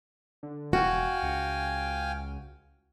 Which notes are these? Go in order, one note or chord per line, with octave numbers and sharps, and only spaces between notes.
D3
E1 F#4 F5 G5 G#5
C#2